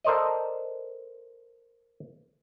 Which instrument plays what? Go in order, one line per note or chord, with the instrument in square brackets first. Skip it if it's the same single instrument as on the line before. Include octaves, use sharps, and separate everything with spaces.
[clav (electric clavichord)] A4 A#4 C5 D5 D#5